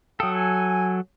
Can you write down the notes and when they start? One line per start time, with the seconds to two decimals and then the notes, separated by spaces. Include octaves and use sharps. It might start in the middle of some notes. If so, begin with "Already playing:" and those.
0.20 F#3 A4 F5 G5 D#6
0.35 G#5